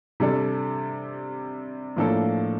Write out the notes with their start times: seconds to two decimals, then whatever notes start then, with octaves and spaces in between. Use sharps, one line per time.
0.20 C3 G3 D4 A4 D5
1.97 A2 F3 A#3 D4 A4